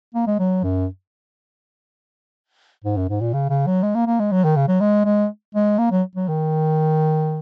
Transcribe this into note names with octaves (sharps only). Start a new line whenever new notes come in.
A#3
G#3
F#3
F#2
G#2
F#2
G#2
A#2
C#3
C#3
F#3
G#3
A#3
A#3
G#3
F#3
D#3
C#3
F#3
G#3
G#3
G#3
A#3
F#3
F#3
D#3